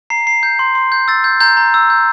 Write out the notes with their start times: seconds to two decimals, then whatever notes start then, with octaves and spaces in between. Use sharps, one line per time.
0.10 A#5 C7
0.27 A#5 C7
0.43 G6
0.59 C6
0.75 C6
0.92 G6
1.08 E6 A6
1.24 G6
1.40 A#5 G6
1.57 A#5
1.74 E6
1.90 G6